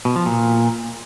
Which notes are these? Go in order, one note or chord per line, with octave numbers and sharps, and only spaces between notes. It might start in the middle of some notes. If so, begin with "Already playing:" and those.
B2
F3
A#2